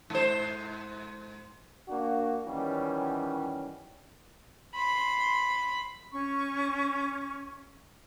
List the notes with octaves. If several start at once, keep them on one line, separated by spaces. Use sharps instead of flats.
G#2 C5
A#3 D4 F#4
D#3 E3 F#3 G3 C#4
B5 C6
C#4 C#6